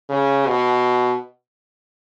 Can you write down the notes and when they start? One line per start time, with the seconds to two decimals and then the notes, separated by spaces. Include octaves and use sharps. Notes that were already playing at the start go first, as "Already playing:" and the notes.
0.09 C#3
0.46 B2